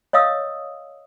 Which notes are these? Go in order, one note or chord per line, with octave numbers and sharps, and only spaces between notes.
C#5 D#5 F5 D#6 E6